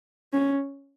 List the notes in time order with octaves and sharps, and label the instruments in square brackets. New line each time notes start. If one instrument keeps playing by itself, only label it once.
[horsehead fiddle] C#4